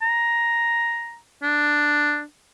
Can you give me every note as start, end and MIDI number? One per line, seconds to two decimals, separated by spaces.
0.02 1.17 82
1.43 2.23 62